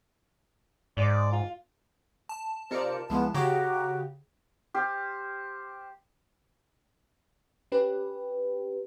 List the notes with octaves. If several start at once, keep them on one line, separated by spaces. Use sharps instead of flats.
G#2 D5
F4
A5
C3 D#4 F4 A#4 C5 D5 C#7
C#2 F3 G#3 B3 E4 F4
C#3 F#4 G4 C#5 A#5 D6
G4 C5 F5
C#4 G4 B4